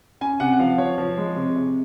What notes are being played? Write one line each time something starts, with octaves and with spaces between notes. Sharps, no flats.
C#4 G#5
C3 F#5
F#5
F3 F5
F3 C#5
F3
G#3
C3
C3